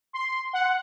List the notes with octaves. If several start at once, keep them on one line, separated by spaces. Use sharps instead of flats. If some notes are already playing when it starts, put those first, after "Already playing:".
C6
F#5